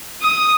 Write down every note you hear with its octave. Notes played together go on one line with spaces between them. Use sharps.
D#6